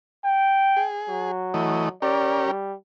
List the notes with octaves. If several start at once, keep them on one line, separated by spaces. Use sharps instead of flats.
G5
G#4
F#3
E3 A3 D#5
C#4 G4 A#4 D5
G3